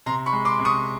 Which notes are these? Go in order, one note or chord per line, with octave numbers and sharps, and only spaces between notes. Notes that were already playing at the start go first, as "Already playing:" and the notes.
C3 A#5 C6
B5 C#6
G#3
C6 D6
C3
C#6 D#6